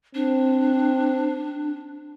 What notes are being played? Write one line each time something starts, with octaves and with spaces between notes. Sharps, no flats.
C4 D4